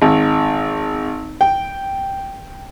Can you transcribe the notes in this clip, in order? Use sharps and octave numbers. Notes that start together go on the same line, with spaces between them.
G#1
G5